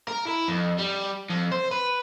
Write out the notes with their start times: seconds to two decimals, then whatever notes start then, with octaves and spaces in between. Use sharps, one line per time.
0.08 A#4
0.27 E4
0.48 F2
0.79 G3
1.30 F2
1.52 C5
1.71 B4